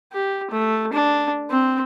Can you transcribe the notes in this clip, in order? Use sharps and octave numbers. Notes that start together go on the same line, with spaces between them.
G4
A3
D4
C4